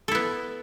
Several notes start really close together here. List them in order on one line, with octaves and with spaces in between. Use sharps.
A4 E4 B3